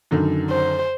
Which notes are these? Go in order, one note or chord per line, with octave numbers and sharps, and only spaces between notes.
F#2 D3 D#3
C5